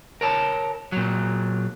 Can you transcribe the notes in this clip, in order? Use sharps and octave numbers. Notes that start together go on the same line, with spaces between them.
A#4 C#5 A5
A#2 F#3